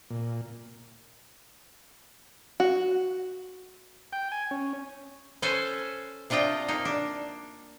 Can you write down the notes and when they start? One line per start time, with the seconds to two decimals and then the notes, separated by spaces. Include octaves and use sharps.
0.10 A#2
2.60 F#4
4.13 G5
4.32 G#5
4.51 C#4
5.42 C#4 A4 B4 C5 G#5
6.30 C3 D4 F4 D#5 G5
6.68 A#3 D#4
6.85 D4